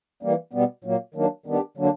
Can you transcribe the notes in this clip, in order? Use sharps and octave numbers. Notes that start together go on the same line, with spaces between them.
E3 G3 A#3
B2 G3 B3
A#2 F#3 A#3
D#3 F#3 A#3 D4
D#3 G3 B3 D4 G4
D3 F#3 A#3 D4